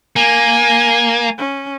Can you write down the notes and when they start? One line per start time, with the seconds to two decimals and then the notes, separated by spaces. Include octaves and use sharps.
0.16 A#3 G#5
1.38 C#4